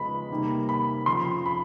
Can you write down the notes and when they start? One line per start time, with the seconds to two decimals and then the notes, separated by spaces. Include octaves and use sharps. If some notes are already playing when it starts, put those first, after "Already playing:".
Already playing: C#3 F3 G#3 B3 B5
0.30 C3 D#3 G3 A#3
0.69 B5
1.06 F2 C#3 F3 C6
1.46 B5